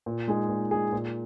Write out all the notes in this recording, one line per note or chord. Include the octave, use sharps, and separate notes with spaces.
A#2
G#3 D#4 G#4
A#2
G#3 D#4 G#4
A#2